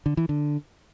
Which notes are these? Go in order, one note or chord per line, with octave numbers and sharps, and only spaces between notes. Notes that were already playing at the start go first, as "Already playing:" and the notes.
D3
E3
D3